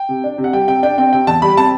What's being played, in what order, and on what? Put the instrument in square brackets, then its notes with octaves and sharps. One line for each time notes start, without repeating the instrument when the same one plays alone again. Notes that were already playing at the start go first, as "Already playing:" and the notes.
Already playing: [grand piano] G5
C3
D4
C3
F#5
G3 G5
C3 G5
D4 G5
C4 G5
C3 G5
E2 A5
G3 B5
C4 A5